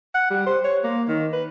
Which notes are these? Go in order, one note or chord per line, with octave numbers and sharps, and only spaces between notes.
F#5
G3
C5
C#5
A#3
D#3
B4